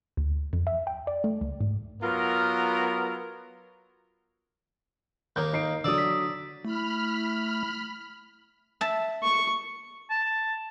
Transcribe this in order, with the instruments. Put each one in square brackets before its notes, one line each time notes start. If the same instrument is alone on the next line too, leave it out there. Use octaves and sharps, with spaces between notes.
[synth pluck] D2
F2
E5
G5
D5
A3
C#2
G#2
[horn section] F#3 B3 F4 A#4
[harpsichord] D#2 A#3 [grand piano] G6
[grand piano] D#4 C7 D7
[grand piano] D3 F#3 [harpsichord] D5 [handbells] D#6 E6
[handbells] B6
[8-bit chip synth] A3 [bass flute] E4 [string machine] B5 F6
[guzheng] E5 A5
[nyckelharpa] C#6
[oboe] A5